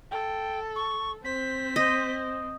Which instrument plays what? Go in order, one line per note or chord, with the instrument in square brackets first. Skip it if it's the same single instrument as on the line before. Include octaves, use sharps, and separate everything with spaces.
[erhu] A4 [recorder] G5
[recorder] C#6
[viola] C4 [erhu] C5 [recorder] B6
[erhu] C5 [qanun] D#5